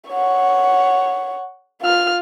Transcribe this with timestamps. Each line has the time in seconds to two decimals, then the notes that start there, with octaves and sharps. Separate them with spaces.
0.10 C#5 F#5
1.81 F4 F6